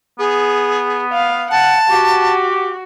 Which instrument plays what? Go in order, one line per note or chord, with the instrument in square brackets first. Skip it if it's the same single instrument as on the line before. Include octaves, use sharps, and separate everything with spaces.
[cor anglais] B3 [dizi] G#4
[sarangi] F5
[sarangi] F#5 [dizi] A5
[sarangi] F#4 [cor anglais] G4